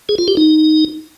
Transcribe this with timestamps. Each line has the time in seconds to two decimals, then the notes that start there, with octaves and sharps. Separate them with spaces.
0.09 G#4
0.18 F4
0.28 G4
0.37 D#4